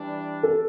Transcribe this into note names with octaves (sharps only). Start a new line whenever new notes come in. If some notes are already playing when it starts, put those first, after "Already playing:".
Already playing: E3 G3 D4
A4